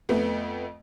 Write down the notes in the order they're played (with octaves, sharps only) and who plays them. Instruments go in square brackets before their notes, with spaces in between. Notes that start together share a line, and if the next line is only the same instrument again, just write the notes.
[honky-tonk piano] F2 A3 B3